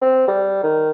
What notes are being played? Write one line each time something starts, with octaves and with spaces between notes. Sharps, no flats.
C4
G3
D#3